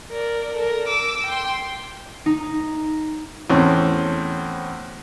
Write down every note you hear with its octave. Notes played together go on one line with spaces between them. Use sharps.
A#4 D5
A4 A#4
D6 E6
G5 C6
D#4
E2 A2 C4 C#4